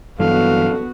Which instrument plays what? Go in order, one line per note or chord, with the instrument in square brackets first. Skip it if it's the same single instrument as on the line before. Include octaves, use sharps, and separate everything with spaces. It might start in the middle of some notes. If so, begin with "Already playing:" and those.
[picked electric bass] G2 E3 F#3 [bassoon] D3 [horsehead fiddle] B3 F#4 [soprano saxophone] F5